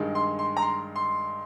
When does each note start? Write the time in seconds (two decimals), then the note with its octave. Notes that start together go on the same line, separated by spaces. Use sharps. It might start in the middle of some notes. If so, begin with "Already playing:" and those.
Already playing: G2 D#3 G#3
0.15 C6
0.39 C6
0.57 A#5
0.62 C6
0.96 C6